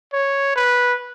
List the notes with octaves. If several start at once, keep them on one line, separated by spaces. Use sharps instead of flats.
C#5
B4